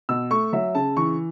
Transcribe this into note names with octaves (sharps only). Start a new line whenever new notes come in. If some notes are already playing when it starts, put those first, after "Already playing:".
B2 E6
A3 C#6
F#3 E5
C#3 A5
E3 C#6